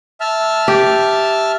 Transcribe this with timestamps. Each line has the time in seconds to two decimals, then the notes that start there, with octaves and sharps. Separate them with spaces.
0.21 E5 A5 F6
0.68 G4